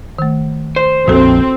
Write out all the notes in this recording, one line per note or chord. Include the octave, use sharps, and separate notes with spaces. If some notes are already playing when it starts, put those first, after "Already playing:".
D#3 A3
C5
A#1 F2 C4 F#4 A4